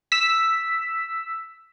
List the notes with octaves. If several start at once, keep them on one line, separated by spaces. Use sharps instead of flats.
E6 B6